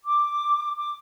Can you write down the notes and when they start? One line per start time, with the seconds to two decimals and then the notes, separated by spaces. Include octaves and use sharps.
0.04 D6
0.76 D6